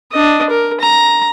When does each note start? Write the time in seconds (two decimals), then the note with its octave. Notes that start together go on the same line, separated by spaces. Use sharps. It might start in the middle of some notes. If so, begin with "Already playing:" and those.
0.12 D4 D#5
0.50 A#4
0.81 A#5